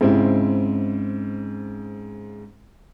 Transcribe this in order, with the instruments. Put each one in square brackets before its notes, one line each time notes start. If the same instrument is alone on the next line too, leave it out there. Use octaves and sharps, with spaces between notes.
[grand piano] G#2 C#3 C4 E4